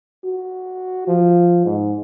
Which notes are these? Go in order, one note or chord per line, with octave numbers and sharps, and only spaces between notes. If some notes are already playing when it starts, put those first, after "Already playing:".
F#4
F3
G#2